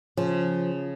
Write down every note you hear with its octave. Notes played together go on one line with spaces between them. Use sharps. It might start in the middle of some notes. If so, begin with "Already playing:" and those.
C#3 F3